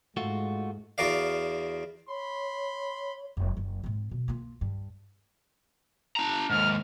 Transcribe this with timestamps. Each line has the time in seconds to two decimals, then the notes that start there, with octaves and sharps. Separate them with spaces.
0.17 G#2 A3 F4 F#4
0.98 E2 F#4 A#4 D5 F5
2.09 C#5 B5 C6
3.37 F1 C#2
3.57 F#1
3.84 G#2 C4
4.11 B2
4.28 A#3 F4
4.61 G2
6.16 D4 A#5
6.50 D#2 G#2 F6